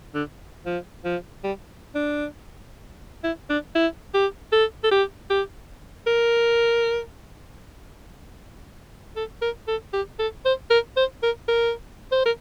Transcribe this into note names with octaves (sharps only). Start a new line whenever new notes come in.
D3
F3
F3
G3
D4
E4
D4
E4
G4
A4
A4
G4
G4
A#4
A4
A#4
A4
G4
A4
C5
A#4
C5
A#4
A#4
C5
A#4